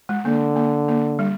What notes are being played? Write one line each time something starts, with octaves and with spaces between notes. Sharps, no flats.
G#3
D3 A#3
A#3
A#3
G3